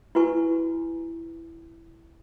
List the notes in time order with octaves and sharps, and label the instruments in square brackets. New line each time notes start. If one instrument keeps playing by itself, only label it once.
[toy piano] E4 F#4 B4 G#5 C#6